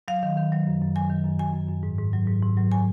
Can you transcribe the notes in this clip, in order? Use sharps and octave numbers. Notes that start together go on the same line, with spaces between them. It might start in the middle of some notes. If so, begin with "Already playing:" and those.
F#3 F5
D#3
D#3
F#3
F#2
F#2
F#3 G#5
D#3
F#2
F#2 G#5
F#2
F#2
G#2
G#2
F#3
G#2
G#2
F#3
G#5